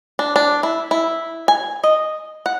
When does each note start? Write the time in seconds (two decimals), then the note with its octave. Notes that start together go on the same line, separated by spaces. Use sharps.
0.19 D4
0.36 D4
0.63 E4
0.91 E4
1.48 G#5
1.84 D#5
2.46 F#5